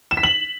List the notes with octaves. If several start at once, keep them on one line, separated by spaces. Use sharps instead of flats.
E7
B6
F#7